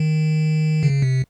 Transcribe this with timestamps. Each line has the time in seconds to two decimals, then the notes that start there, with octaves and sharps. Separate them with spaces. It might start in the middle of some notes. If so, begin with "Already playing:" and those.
Already playing: D#3
0.83 C#3
1.02 C3